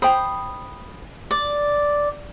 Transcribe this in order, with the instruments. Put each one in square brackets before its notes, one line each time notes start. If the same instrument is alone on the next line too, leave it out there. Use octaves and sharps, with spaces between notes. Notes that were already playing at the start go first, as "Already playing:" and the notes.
[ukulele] C5 G5 [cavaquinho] B5 D#6
[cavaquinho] D5